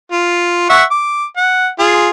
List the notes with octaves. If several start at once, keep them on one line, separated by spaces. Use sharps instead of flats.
F4
E5 F#5 C#6
D6
F#5
F4 G#4